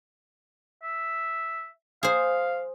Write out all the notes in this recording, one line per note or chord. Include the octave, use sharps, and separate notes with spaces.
E5
G#4 C5 F5